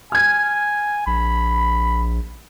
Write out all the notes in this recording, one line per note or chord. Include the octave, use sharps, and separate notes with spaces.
G#5 F6 G#6
A#1 B5